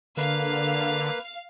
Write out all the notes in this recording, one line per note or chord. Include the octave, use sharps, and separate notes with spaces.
D3 A#3 B4 F5